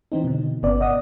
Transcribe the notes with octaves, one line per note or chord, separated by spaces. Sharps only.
E3 C4 D#4
B2 D3
G1 C#3 B3 D5
D5 D#5 F#5 D#6